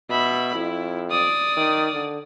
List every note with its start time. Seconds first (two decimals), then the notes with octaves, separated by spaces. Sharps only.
0.10 B2 E5 B5
0.55 F2 E4
1.11 D5 D#6
1.57 D#3
1.94 D3